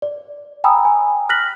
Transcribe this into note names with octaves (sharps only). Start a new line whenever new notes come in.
D5
G5 G#5 A#5 B5 D#6 E6
G#5
F6 F#6 A#6 B6 F#7